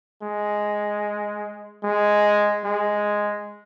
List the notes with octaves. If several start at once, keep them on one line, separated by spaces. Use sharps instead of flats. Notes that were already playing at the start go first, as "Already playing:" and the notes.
G#3
G#3
G#3